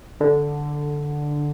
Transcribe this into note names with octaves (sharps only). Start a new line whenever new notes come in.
D3